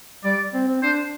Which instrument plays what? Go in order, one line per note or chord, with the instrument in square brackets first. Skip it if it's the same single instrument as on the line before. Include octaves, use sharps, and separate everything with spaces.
[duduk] G3 [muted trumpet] D5
[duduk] C4
C4
[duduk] D4 [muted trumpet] C5